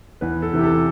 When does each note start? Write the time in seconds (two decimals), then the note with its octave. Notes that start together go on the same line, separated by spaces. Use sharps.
0.21 E2 B4
0.42 A4
0.54 C3 E3
0.59 G4
0.64 A4